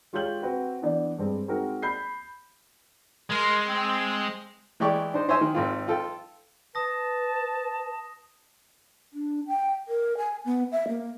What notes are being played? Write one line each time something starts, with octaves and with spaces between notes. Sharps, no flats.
G#3 F4 G4 C#5 G6 F#7
C4 F#4 B4
E3 B3 D4 D5
G2 G3 G#3 C4
G#3 C4 D#4 F#4 A#4
B5 G6 C7
G#3 A#4 D#5 C6
C4
E3 G#3 G4 D5 C#6 D6
D4 D#4 C5
D#4 C5 C#5 E5 G#5 C6
D#3
G#1 C4 F4
F4 A4 G5
B4 A5 D#6 A#6
D4
G5
A#4
G#5
B3
E5
A#3